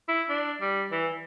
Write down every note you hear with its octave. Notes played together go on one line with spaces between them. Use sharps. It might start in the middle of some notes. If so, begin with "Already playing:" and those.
E4
D4
G3
E3